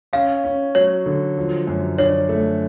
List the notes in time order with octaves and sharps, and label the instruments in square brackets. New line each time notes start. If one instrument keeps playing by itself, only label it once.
[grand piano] C#4 [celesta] F5
[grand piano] C#4
[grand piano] F#3 [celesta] C#5
[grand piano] D3
F3
F#2
[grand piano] D4 [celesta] C#5
[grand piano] A3